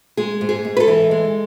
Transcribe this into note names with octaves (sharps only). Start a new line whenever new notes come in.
G#3 G#4
G#2
G#4
G#2
B4
A4
E3
G#3